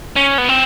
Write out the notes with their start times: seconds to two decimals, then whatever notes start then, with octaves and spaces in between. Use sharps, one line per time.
0.16 C#4
0.38 B3
0.49 C4